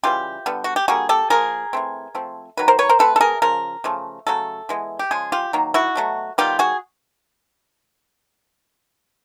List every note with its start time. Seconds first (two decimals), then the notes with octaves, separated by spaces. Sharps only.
0.03 C#3 E3 G3 F4 G4
0.46 D3 G3 B3
0.64 F#4
0.76 G4
0.88 D3 G3 A#3 F#4 G#4
1.09 G4 A4
1.30 F3 A#3 G#4 A#4
1.73 E3 A3 C4
2.15 F3 A3 C4
2.57 D#3 F#3 B4
2.68 A#4 C5
2.79 B4 C#5
2.89 A#4 C5
2.99 E3 A3 C4 A4 B4
3.16 A4
3.21 G#4 A#4
3.42 C#3 F3 A#4
3.84 C#3 F3 A3
4.27 C#3 F#3 A3 A4
4.69 E3 G#3 B3
4.99 G4
5.11 C#3 F3 G#3 G#4
5.32 F4 G4
5.53 D#3 F#3 A#3
5.74 E4 F#4
5.95 B2 F#3 A3
6.38 D#3 G3 B3 F4 G4
6.59 F#4 G#4